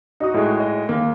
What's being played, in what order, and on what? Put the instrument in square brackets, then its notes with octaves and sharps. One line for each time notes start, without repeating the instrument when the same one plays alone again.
[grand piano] D#4 F#4 D#6
[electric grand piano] A2 G#3
[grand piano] D#5
[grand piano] D#2 [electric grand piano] A#3